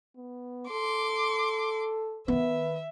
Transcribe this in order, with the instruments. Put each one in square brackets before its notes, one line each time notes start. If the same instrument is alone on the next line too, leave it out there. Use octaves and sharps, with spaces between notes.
[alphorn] B3
[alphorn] A4 [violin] C6 D6
[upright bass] D#3 B3 [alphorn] B4 [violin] E5